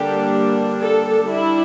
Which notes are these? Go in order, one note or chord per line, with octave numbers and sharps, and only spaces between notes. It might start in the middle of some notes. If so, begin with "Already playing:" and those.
Already playing: D3 G3 A#3 D4 G4
A4
G3 D4 E4